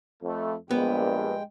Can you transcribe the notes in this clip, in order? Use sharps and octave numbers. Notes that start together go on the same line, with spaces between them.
F2 A3
A#1 G2 G#3 B3 G5